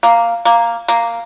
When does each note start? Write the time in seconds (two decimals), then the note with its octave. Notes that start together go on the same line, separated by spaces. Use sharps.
0.03 A#3
0.45 A#3
0.88 A#3